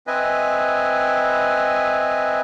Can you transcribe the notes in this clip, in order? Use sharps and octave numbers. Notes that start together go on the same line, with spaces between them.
C4 B4 D#5 E5 G#5